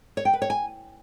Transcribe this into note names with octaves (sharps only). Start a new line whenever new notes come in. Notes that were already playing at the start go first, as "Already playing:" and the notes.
C#5
G5
B4
C#5
G#5